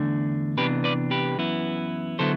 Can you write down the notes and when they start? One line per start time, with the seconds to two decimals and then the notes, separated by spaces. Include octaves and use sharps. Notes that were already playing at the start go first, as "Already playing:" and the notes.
Already playing: E2 D3 A3 D4
0.57 C3 E3 B3 D4 G4 B4
0.84 B4 D5
1.11 G4 B4
1.38 F#2 E3 B3 E4
2.19 D3 F#3 B3 E4 A4 C5